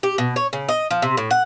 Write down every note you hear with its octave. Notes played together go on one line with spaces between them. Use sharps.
G4
B2
C#5
C#3
D#5
F3
C3
A2
F#5